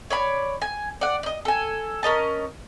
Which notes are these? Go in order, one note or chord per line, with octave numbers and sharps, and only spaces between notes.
C#5 D5 B5
G#5
D5 F#5
D5 D#5
A4 G#5
C#4 A#4 D#5 A5